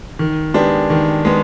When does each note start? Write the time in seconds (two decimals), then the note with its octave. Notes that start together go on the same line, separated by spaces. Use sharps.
0.19 D#3
0.54 G#3 B3 D4 G4
0.90 D#3
1.25 G#3 B3